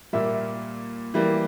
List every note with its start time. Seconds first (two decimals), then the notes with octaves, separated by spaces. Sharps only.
0.13 A#2 G3 A#3 E5
1.14 E3 G3 A#3